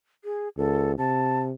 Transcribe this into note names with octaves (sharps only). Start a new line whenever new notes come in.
G#4
C#2 A4
C3 A5